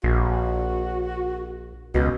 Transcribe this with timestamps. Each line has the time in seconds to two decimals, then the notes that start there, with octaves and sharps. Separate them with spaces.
0.03 A#1 F#4
1.95 C#2 B2